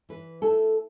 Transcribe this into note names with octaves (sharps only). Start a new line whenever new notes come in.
E3 B4
A3 E4 A4